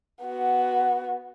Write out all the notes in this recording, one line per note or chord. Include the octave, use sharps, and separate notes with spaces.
B3 F#4